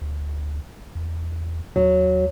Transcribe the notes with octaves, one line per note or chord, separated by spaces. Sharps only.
D2
E2
D#2 F#3